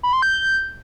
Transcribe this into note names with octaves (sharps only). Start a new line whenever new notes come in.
B5
C6
G6